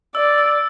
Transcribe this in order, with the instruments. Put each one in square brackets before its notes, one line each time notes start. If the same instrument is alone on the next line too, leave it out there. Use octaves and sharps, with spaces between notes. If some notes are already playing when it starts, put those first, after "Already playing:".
[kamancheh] D5 [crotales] E6
[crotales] E6